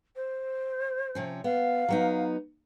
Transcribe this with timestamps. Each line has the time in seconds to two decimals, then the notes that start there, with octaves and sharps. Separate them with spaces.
0.16 C5
1.15 C3 F3 C#4
1.44 B3 F5
1.88 F#3 B3 D#4